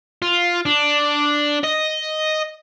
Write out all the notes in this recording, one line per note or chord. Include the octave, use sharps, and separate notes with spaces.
F4
D4
D#5